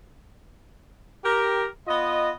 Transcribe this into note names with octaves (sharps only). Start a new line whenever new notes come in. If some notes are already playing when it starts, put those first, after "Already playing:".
G4 A#4
B3 F4 D#5